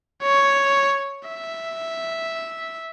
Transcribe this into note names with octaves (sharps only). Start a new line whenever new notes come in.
C#5
E5